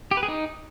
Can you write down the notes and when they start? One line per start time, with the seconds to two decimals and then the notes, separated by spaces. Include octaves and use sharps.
0.11 G4
0.17 B4
0.23 G#4
0.28 D#4